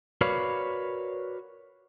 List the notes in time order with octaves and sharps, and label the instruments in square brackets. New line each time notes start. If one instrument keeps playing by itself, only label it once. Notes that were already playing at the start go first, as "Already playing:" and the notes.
[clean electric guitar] F#4 A#4 B4 C#5 D5 F5